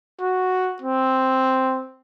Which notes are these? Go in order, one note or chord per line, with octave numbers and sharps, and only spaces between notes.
F#4
C4